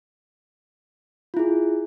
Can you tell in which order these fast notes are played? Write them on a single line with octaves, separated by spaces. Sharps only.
F4 E4 G#4